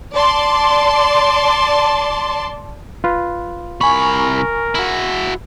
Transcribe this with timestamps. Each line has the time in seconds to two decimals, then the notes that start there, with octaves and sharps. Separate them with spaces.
0.15 D5 A5 C6
3.04 F4 B4
3.81 C2 A#4 G#5 B5 C#6
4.75 E4 F#4